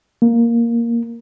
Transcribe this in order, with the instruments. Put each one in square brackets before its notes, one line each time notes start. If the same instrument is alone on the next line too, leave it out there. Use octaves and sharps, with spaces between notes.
[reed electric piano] A#3